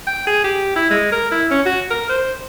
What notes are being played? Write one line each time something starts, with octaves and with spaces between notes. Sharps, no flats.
G5
G#4
G4
E4
G#3
A#4
E4
C#4
F#4
A#4
C5